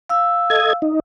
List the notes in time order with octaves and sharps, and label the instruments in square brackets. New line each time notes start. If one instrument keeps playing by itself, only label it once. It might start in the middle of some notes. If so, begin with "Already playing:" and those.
[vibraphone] F5 E6
[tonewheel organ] A4 D#5 G#6
D#4